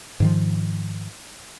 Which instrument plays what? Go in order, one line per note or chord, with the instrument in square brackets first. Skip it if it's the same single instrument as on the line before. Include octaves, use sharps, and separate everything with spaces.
[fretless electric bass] G#2 D#3 F3